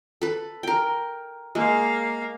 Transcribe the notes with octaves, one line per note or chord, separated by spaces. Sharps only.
A4 B4
A#4 G5
G#3 A#3 F5